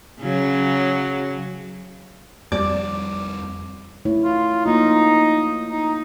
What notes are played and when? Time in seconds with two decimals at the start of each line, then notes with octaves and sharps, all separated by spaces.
0.21 C#3 F#3
2.52 F2 G3 C4 D5
4.05 A3 E4 C#5
4.24 F4
4.66 A#3 D#4 F4
5.70 D#4